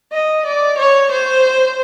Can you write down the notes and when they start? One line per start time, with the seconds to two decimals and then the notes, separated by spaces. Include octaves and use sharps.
0.13 D#5
0.46 D5
0.78 C#5
1.11 C5